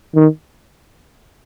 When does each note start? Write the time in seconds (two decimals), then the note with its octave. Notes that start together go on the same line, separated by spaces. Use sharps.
0.15 D#3